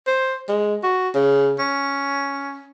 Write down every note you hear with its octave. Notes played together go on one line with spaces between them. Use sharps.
C5
G#3
F#4
C#3
C#4